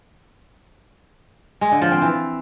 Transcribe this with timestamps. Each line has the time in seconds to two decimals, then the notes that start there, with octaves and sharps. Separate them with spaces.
1.61 G#3
1.71 D3
1.82 F3
1.92 C4
2.02 E3